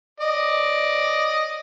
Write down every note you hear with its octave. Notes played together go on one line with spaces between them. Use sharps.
D5 D#5